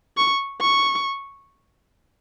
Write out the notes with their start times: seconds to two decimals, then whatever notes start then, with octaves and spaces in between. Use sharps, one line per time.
0.17 C#6
0.61 C#6